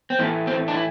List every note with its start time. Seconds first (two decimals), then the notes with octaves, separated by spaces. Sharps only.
0.10 C4
0.19 A2 E3 A3 A#3
0.47 C4
0.68 D4
0.75 E4